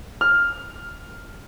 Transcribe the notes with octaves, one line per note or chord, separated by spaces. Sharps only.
F6